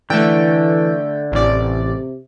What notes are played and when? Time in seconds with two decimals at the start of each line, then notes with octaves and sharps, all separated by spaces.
0.10 D3 E3 A3 G5
1.32 A1 C3 D5